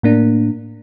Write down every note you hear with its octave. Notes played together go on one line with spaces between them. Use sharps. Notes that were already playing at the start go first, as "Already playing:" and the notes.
A2 A#3 D4